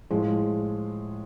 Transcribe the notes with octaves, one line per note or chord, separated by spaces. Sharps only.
A2 F3 G#3